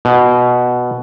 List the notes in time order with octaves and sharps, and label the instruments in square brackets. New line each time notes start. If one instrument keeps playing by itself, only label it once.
[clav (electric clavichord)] B2